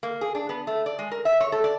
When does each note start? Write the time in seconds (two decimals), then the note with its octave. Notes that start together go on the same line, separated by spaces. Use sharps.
0.03 A#3
0.21 G#4
0.35 D4
0.49 B3
0.67 A3
0.86 D5
0.99 G#3
1.11 A#4
1.25 E5
1.40 C#5
1.52 A4
1.64 D5